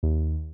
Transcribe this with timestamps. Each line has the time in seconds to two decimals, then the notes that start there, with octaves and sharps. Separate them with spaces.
0.03 D#2